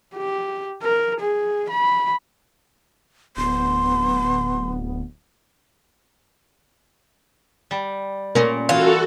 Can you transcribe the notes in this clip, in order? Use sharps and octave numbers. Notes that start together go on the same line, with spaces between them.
G4
A#4
G#4
B5
D1 B3 C6
G3
A#2 C#4 A#4
E3 F4 F#4 A4